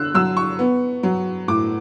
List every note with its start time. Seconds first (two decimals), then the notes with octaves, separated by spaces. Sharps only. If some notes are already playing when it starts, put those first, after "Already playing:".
Already playing: D3 E6 F#6
0.14 F#3 E6
0.37 C#6
0.59 B3
1.03 F#3
1.48 A2 D6